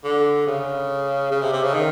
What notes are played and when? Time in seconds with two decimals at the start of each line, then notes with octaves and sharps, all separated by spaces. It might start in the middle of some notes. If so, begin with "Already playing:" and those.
0.04 D3
0.47 C#3
1.31 C#3
1.42 C3
1.53 C3
1.63 C#3
1.74 D#3